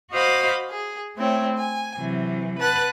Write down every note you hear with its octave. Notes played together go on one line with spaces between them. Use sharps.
F#4 C5 D#5 F5 B5 D6
G#4
A3 C4 E4 C#5
G#5
C3 E3 F#3
B4 F#5 A5 F#6 A6